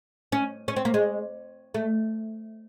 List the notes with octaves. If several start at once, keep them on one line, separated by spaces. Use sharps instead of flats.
C#4
C#4
C4
A#3
G#3
A3